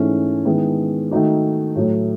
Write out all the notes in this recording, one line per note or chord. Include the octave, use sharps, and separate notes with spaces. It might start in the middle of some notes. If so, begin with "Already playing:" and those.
Already playing: G#2 E3 A3 C#4 E4
D#3 G#3 B3 E4
D#3 A3 D#4 F#4
A2 F#3 A3